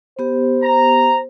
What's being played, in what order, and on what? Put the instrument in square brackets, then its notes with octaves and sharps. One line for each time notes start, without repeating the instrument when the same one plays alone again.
[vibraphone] B3 G4 [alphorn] C5
[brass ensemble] A#5